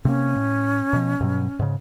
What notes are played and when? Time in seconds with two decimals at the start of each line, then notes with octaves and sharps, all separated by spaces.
0.05 C3 A3 A#3 C#4
0.36 A2
0.93 B2 F3
1.21 G2 B2 F#3
1.59 G#2 C#3